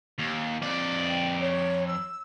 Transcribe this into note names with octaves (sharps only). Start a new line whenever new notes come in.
D#2
F2 D5
G5
C#5
E6